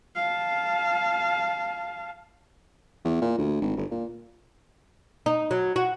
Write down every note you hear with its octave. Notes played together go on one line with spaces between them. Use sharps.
F5 A5
E2
A#2
D2
G#1
G1
A#2
D#4
F#3
F#4